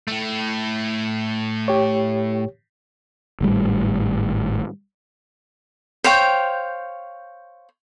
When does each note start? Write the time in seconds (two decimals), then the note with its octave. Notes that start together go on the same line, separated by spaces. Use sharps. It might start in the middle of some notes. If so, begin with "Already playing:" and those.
0.08 A2 A3
1.68 G4 C#5
3.41 G#1 A2 G3
6.04 C5 C#5 F5 G5